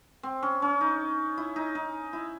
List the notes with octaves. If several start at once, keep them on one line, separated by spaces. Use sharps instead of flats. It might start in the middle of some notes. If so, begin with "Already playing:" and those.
C4
C#4
C#4
D#4
E4
D#4
D#4
E4